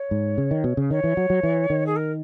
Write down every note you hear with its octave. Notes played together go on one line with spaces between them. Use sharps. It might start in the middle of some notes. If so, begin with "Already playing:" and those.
Already playing: C#5
G#2
C#3
D#3
B2
C#3
D#3 C#5
E3
F#3
F#3
E3
D#3
G#4
A#4